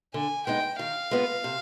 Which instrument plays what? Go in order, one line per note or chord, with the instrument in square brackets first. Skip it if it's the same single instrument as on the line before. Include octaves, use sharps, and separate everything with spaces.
[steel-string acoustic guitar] D3 [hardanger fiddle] G#5
[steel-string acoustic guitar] G#3 B3 D#4 [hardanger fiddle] G5
[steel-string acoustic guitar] D#3 [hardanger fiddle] F5
[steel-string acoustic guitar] G#3 B3 F4 B4
C3